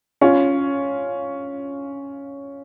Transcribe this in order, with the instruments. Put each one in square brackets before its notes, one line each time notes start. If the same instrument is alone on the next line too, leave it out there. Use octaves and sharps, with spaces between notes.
[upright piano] C#4 F4